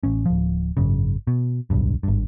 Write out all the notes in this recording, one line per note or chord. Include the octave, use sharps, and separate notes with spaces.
A1 C#4
D1 F3
G#1 F#2 C#3
B2
D1 B1 G2
G#1 G2